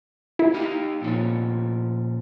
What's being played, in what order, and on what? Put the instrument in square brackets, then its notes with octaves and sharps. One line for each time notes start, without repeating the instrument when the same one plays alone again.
[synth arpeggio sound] E4
[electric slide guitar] D#4 G4 F5
A#2 F3 C#4